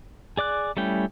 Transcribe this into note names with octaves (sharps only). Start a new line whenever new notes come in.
G#4 D5 D6 F#6
G3 A3 C#4 E4 G5